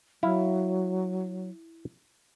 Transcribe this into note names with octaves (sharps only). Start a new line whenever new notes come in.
F#3 E4 F5